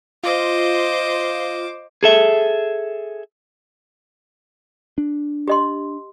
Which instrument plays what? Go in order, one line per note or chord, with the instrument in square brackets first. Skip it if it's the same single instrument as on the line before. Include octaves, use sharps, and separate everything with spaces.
[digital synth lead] F4 [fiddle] C5 D6 [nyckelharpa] D#5
[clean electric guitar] G#4 A4 E5
[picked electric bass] D4
[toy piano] G4 D#5 C6